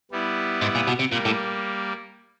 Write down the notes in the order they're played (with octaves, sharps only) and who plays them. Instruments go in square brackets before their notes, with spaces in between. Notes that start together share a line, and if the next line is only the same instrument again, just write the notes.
[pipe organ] G3 B3 E4
[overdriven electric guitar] G#2
A#2
B2
C3
[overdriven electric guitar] A#2 [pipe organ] G3 A#3
[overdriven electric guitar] A2